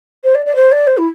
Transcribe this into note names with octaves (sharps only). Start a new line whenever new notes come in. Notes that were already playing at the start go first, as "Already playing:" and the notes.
C5
D5
D5
C5
D5
C5
E4